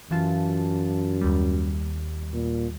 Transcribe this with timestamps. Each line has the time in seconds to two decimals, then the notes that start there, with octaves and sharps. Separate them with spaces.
0.11 F#2 E3 F4 A5
1.21 D#2 G3
2.33 A#2